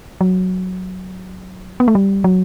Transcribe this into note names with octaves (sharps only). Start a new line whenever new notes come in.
F#3
B3
A3
G3
F#3